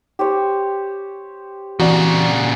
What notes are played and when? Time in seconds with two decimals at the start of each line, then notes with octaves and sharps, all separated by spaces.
0.19 G4 C5 C#5
1.80 A#2 C#3 E3 C4 F#4 D5